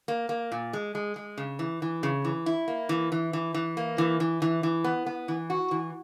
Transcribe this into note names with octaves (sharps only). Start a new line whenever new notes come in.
A#3
A#3
A#2
G#3
G#3
G#3
C#3
E3
E3
C#3
E3
E4
A#3
E3
E3
E3
E3
A#3
E3
E3
E3
E3
B3
B3
E3
F#4
E3